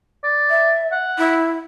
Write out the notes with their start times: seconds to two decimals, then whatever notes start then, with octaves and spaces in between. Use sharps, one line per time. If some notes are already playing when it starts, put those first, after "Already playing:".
0.24 D5
0.50 E5
0.92 F#5
1.18 E4